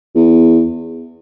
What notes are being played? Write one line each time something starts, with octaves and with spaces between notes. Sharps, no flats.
E2